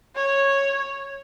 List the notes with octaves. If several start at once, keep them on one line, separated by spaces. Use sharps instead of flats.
C#5